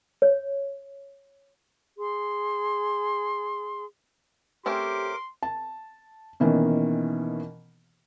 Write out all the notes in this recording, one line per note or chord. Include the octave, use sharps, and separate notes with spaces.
C#5
G#4 C6
A3 C4 C#4 G4 A#4 C6 D6
A5
B2 D#3 E3 A#3 C#4